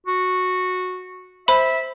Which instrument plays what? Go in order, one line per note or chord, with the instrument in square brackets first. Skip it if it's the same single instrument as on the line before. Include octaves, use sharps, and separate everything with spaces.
[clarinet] F#4
[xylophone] C5 B5 [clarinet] E5